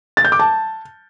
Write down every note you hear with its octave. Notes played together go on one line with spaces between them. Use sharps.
A6
G6
D6
A5